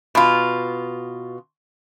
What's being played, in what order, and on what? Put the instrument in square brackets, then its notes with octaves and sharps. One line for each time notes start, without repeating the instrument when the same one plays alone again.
[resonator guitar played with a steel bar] B2 F4